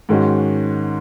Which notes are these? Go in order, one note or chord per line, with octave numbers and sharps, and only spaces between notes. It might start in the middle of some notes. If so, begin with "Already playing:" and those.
G#2 D#3 G#3 C#4 F#4